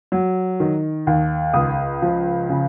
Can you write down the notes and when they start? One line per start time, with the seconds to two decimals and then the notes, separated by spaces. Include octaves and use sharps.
0.12 F#3
0.60 D#3
1.07 D#2
1.54 C#2 D#6
2.02 F3
2.49 C#3